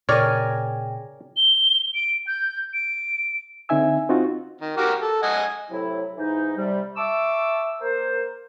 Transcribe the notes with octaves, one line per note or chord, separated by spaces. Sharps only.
A#2 C#3 G#4 A#4 C#5 D5 G5 G#5
G7
D7
G6
D7
D3 C4 D#4 E5 G#5 E6
C4 D#4 F4 F#4
D#3
F#4 G4 A#4
A4
D#5 F#5 G#5
A2 C3 F#3 E4
G#2 E3 D#4
C3 G3
E5 A5 C#6 D6 E6
A#3 A#4 C5